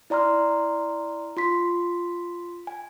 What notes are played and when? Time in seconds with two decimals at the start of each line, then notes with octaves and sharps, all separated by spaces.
0.10 E4 D5 A#5 C6 F6
1.37 F4 C6 B6
2.67 G#5